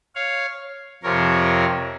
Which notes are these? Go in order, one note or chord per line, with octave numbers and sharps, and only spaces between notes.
C#5 F5
F2 C3 F3 A#4 C#5